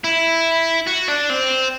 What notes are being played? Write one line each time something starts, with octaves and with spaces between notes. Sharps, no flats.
E4
F#4
D4
C4